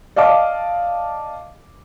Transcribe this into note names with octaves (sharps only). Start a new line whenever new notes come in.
D5 D#5 F5 A5 D6